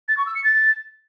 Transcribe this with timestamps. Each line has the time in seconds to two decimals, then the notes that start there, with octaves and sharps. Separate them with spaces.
0.08 A6
0.17 C#6
0.26 E6
0.35 C#7
0.44 A6